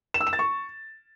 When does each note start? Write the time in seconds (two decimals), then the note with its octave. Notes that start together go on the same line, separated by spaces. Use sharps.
0.14 E7
0.21 E6
0.27 E7
0.33 A6
0.39 C#6